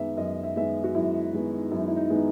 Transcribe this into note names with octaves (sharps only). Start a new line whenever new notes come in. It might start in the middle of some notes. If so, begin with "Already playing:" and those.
Already playing: F#2 D#3 G#3 B3 E5
F#2 D#5
E5
D#3 G#3 B3 E5
F#4
F#2 E4
D#3 G#3 B3
F#2 E4
D#4
E4
D#4
D#3 G#3 B3